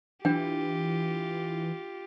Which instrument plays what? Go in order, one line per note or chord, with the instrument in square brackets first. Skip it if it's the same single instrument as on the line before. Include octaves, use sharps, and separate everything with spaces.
[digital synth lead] E3 [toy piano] D4 G5 [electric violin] F4 G4